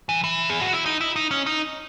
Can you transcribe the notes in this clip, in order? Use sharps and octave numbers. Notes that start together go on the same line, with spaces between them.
E3
E3
G#4
F#4
E4
D#4
E4
D#4
C#4
D#4